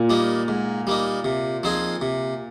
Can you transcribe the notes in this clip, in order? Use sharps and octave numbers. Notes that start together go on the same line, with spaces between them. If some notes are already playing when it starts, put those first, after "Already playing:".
Already playing: A#2
G3 A#3 D#4
G#2
G3 A#3 D#4
C3
F3 C4 D#4 G#4
C3